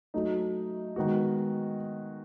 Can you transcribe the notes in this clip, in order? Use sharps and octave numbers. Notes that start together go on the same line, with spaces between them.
F#3 A3 D#4
D#3 G#3 B3 F#4